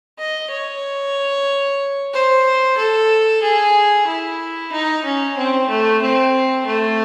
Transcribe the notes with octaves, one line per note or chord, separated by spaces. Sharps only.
D#5
C#5
C5
A4
G#4
E4
D#4
C#4
C4
A3
C4
A3